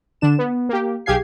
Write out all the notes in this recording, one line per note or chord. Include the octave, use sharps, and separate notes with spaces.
D3 D4 E7
B3
A#3 G4
B1 G4 G#4 F5 G#6 C7